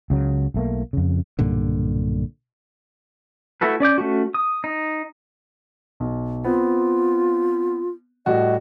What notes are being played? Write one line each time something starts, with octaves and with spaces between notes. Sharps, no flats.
C#2 C#3 F#3
B1 A3 A#3
F2 C#3
B1 G2 A#2 D3
A3 E4 F#4 A4 B4
C#4 D5 D6 G6
A3 C#4 F#4
D#6
D#4
B1
B3 C4 F4
A2 G3 F#4 D#5